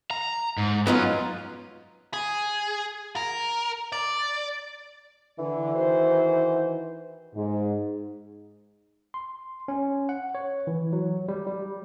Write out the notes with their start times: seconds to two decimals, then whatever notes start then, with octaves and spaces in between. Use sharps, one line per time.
0.11 A#5
0.58 G#2
0.87 F#3 B3 C#4 D#4 F4
2.14 G#4
3.16 A#4
3.92 D5
5.39 D3 E3
5.74 D#3 F#4 C5
7.35 G#2
9.14 C6
9.68 C#4
10.09 F#5
10.35 C#5
10.67 E3
10.93 F#3
11.28 G3
11.47 G3